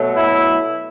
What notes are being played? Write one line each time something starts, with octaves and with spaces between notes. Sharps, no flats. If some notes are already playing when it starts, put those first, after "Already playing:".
Already playing: B2 F#3 A3
E4